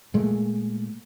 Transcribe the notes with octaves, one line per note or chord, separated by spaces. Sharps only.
A#2 G#3 A3